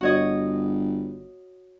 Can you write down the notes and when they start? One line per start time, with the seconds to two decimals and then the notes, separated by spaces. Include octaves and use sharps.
0.01 G1 F#4 C#5 D#5